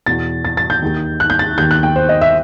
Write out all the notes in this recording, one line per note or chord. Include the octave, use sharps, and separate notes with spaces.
E2 B2 A6
A6
A6
G6
D#2 D#3
F#6
G6
A6
D#2 D#3 G6
F#6
G5
C5
D#5
E5